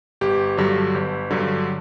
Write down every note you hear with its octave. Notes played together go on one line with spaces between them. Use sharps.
G1 G4
G2 D3 F#3
G1
G2 D3 F#3